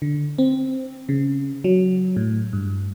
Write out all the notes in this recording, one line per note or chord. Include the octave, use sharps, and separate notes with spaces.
D3
C4
C#3
F#3
A2
G2